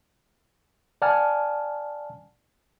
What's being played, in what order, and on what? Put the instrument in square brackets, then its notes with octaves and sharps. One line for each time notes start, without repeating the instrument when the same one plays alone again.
[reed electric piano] D5 F#5 G#5 A5 F6